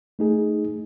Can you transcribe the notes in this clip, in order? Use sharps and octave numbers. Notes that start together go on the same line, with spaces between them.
A3 D#4 G#4